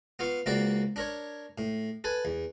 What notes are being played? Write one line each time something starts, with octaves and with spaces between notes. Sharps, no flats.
B3 F4 F5 C#6
C#2 A#3 C4 F#4 D5 E5
D4 A#4 C#5
A2
A4 B4 G#5
E2